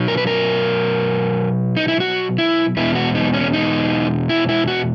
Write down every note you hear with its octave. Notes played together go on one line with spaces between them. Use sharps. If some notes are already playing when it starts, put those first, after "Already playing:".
Already playing: B2 F#3
A#4
B4
A#4
D#4
E4
F#4
E4
E2 B2 G#3 E4
F#4
D#4
C#4
D#4
E4
E4
F#4